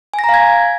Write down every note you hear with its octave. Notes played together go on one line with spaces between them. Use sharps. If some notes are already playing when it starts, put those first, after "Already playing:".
G#5
A#6
A#5
F5
G#6